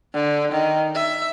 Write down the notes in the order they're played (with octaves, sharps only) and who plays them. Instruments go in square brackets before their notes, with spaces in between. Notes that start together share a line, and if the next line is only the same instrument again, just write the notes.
[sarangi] D3
D#3
E5